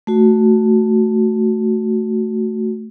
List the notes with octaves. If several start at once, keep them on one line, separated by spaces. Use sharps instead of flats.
A3 F#4